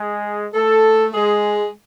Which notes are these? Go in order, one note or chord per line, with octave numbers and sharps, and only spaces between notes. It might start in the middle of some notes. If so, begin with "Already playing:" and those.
Already playing: G#3 G#4
A3 A4
G#3 G#4